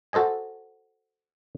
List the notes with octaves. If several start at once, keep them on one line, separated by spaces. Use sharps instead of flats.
F#4 A4 C5 D#5 G#5